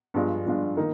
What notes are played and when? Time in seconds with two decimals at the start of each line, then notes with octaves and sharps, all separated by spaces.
0.14 G2 F3 G#3 D4 F4
0.46 G2 F3 G#3 D4 F4
0.77 D#3 A#3 D#4